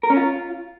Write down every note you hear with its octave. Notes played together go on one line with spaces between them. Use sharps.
A#4
C#4
F4